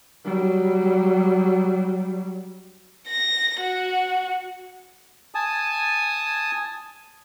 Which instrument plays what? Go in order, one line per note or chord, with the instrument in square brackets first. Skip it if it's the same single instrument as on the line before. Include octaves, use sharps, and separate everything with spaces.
[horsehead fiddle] F#3 G3
[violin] A#6
F#4
[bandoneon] G#5 A5 D#6